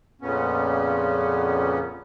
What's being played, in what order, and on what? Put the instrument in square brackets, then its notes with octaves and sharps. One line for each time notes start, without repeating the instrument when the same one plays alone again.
[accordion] F2 A#2 C#3 B3 C#4